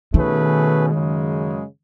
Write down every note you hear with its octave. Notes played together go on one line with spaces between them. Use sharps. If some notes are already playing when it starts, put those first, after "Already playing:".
B2 D#3 A3 C#4 G#4 B4
F#2 C#3 G#3